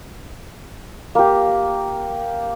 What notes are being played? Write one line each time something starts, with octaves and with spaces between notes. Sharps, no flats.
A#3 G4